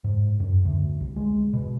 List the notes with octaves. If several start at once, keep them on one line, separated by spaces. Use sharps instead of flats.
G#2
F#2
D2
C2
G#3
B2